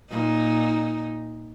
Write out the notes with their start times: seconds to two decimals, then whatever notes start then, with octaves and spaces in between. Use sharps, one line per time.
0.10 A#2 D#4